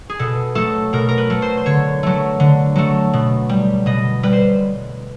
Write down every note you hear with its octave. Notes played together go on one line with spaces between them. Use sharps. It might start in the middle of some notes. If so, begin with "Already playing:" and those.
G#4
B2 A4
F#3 A3 A4
B2 A#4
A#4
B4
F#3 A3
C5
C5
D3 C#5
F#3 A3
D3
F#3 A3
B2
G3
B2 D#5
G3 B4
C5